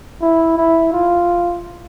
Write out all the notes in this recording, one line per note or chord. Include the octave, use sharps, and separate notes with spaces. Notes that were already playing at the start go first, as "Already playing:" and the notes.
E4
E4
F4